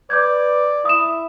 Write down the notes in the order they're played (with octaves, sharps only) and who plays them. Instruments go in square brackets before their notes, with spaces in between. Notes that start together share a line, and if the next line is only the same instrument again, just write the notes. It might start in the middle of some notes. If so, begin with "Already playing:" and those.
[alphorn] B4 [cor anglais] D5 [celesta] D6 G6 G#6
[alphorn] E4 [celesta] D#6 E7